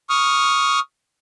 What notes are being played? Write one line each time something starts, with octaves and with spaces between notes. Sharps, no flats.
C#6 D#6 F6